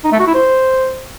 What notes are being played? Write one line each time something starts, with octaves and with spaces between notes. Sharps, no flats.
D#4
A3
F#4
E4
C5